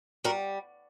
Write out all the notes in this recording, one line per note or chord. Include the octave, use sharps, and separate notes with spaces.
G3 F#4 A#4